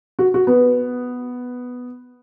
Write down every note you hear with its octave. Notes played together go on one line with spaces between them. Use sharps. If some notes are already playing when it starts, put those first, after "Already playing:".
F#4
F#4
B3